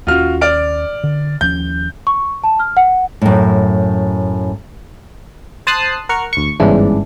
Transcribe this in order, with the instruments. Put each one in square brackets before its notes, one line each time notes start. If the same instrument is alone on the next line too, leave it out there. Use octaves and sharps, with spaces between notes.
[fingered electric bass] D#2 G#3 C#4 [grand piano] F4 F#4 F6
[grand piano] D5 F6 D7
[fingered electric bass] D3
[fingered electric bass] D#2 F3 C#4 [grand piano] G6
[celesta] C#6
A5
F6
F#5
[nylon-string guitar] F#2 A2
[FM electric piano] C5 A5 D#6 F#6 C7
A#4 F#5 C#6 F6
D2 C#6
G1 G#2 C#3 E3 D4